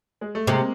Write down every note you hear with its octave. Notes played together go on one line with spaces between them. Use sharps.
G#3
A3
C3 G#3 A#3